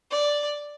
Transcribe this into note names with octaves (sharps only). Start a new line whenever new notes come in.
D5